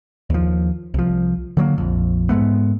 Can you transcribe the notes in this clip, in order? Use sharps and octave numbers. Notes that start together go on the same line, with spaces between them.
D#2 F3
C2 F3
D3 F#3 G#3 A#3
A#1 F2
G#2 G#3 A3 B3